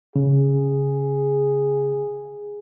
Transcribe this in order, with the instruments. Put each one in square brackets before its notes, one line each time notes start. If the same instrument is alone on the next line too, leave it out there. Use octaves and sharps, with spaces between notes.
[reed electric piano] C#3 [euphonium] G#4